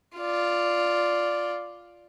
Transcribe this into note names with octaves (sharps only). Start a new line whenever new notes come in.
F4 D5